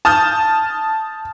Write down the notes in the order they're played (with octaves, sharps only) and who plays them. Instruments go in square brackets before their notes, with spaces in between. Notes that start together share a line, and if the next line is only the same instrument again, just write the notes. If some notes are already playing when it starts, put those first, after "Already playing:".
[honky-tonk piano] A5 D#6 F6 G6